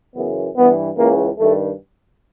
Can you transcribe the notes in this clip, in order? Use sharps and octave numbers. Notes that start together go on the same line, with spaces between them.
F#2 C#3 E3 B3
G2 E3 B3
C#2 C#3 E3 A#3
G2 D#3 A3